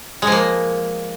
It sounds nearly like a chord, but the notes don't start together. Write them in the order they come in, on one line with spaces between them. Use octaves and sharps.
G#3 F3 A#3